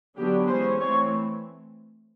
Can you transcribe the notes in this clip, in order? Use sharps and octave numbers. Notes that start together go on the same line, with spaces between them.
D3 F#3 B3 D4 G4
E3 G#3 C#4 C5
E3 A3 C4 C#5